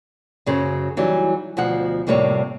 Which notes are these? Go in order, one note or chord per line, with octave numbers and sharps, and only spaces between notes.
F#2 C#3 F#3 C5
E3 F#3 G3 D#4
D2 B2 F3 F#5
F2 A2 C3 G3 A#3 C#5